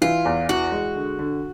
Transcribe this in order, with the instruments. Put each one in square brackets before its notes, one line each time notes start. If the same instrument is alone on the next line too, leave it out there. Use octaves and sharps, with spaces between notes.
[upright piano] E3 [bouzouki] F4
[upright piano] E2
[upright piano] E3 [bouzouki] F#4
[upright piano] G#3
D3
D3